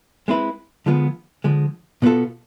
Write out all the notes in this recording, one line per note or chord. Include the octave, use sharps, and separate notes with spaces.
G#3 C4 E4 B4
D3 F3 G#3 B3 F4
D3 F3 G#3
B2 B3 F4 A4